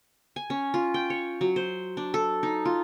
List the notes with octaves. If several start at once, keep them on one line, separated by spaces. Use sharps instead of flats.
G#5
C#4
F4
G5
C#5
F#3
C5
D4
A4
D#4
F4